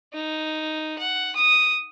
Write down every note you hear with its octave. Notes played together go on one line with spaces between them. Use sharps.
D#4
F#5
D#6